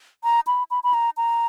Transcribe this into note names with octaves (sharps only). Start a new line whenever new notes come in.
A#5
B5
B5
B5
A#5
A#5